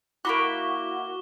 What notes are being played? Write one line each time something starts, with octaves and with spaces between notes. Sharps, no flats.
A#3 E4 F#4 B5 D6 F#6 G7